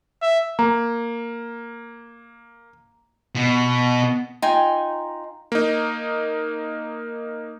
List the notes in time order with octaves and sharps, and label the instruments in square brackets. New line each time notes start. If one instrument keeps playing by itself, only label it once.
[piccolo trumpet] E5
[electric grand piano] A#3 [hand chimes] A#5
[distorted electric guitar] B2
[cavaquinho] D#4 F4 G5 G#5
[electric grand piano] A#3 D#4